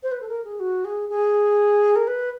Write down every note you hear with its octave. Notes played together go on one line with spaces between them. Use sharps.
C5
B4
A4
A#4
G#4
F#4
G#4
G#4
A#4
B4